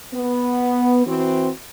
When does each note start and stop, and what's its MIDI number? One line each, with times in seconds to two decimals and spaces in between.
0.14 1.02 59
1.07 1.49 52
1.07 1.49 60
1.07 1.49 66